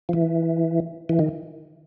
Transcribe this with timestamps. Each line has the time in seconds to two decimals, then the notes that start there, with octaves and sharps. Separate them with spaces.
0.09 F3
0.13 E3
1.09 E3
1.19 D#3